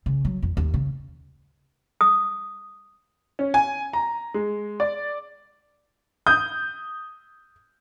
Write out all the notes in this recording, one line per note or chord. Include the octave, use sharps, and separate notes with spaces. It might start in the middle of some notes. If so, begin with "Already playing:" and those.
C#3
F#3
F2
D#2
C#3
D#6
C#4
G#5
A#5
G#3
D5
D#6 G6